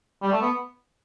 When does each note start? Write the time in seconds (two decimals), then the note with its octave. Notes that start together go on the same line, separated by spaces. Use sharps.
0.22 G3
0.32 A3
0.42 B3